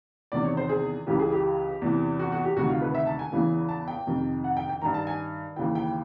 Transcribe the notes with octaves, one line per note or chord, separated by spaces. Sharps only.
E2 C3 D#3 D5
C#5
C5
G#4
C#2 C#3 E3 G4
G#4
G4
E2 C3 E3
F#4
F#4
G4
D2 C3 D#3 F#4
F4
B4
E5
A5
G#5
E2 C#3 E3
A5
G5
F2 C3 D#3
F#5
G5
G5
G2 D#3 A#5
A5
G#5
D#2 C#3 E3 G5
G5